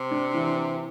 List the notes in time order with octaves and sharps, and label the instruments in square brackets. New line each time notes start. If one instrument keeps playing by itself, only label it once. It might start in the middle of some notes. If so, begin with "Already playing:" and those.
Already playing: [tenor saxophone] C3
[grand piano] D4
E3